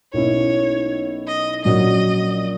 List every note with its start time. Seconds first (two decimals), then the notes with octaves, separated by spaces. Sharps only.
0.13 B1 B2 A#3 C#4 E4 C#5
1.27 D#5
1.65 A#1 A#2 F#3 C#4 F#4 D#5